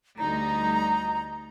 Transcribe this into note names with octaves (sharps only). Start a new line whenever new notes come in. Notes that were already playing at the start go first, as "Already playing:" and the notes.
D2 G3 D#4 A#5